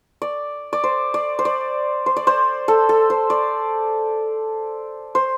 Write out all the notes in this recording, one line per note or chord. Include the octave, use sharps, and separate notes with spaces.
D5
D5
C5
D5
C5
D5
C5
D5
C5
A4
A4
C5
D5
C5